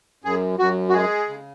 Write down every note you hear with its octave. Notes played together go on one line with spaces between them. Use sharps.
F#2 G#4
F#2 F#4
F#4
G#3 G#4
C#3